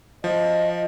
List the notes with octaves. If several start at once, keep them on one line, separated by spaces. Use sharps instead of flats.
F3 D#5